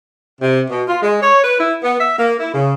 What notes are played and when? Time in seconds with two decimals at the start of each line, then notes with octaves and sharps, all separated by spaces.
0.41 C3
0.70 B2
0.89 F4
1.02 G#3
1.22 C#5
1.43 B4
1.60 E4
1.82 B3
1.99 E5
2.18 A#3
2.39 E4
2.52 C#3